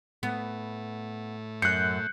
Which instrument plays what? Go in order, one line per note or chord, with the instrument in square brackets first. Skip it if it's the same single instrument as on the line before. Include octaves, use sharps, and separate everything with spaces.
[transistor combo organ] A2 A3 [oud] B3
[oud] F#2 [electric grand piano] F#6 G6 [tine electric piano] C7 C#7